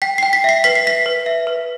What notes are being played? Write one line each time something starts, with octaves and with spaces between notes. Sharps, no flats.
G5 B6
G5 C7
B6
E5 C7
B4 B6
C7
E5 B6
B4
E5
B4